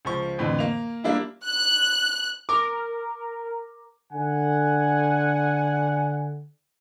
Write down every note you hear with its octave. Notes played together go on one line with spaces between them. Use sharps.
C#2 F3 C#6
F2 A2 D3 E3
A#3 F7
G3 A#3 D4 E4 F4
F#6
A#4 D6
D3 F#5 G#5